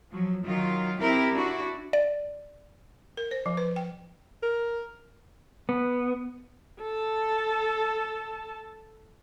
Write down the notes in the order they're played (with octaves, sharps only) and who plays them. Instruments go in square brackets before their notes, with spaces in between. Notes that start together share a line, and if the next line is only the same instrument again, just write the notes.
[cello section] F3 F#3
D#3 F#3 F4
C4 E4 G4 A#4
D4 E4 F#4
[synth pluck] D5
[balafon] A#4
C5
F3
B4
G5
[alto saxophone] A#4
[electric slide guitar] B3
[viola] A4 A5